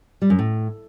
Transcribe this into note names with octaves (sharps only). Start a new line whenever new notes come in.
G3
F#2
A2